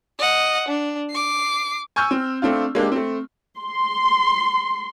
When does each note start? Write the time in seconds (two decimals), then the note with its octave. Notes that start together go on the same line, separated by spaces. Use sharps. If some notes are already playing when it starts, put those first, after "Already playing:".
0.19 D#5 F#5
0.68 D4
1.11 D6 C7
1.96 G#5 C#6 E6 F6 G6
2.11 C4
2.42 A3 C4 D4 F4
2.75 G#3 A#3 D4 G4
2.92 A3 C4
3.58 C6